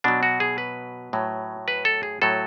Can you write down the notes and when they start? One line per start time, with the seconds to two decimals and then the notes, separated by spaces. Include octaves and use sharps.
0.04 B2 F#3 D4
0.23 F#4
0.40 G#4
0.58 B4
1.13 A2 F#3
1.68 B4
1.85 A4
2.03 G#4
2.22 A2 F#3 A4